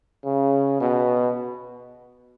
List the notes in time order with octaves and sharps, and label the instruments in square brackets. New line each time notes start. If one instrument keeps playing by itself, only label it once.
[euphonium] C#3
B2